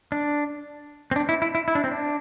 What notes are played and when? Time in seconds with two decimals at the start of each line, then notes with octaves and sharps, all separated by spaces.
0.12 D4
1.11 C4
1.16 D4
1.29 E4
1.42 E4
1.55 E4
1.68 E4
1.75 D4
1.84 C4
1.92 D4